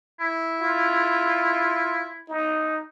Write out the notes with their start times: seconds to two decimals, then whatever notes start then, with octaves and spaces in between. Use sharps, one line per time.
0.20 E4
0.61 F4
2.29 D#4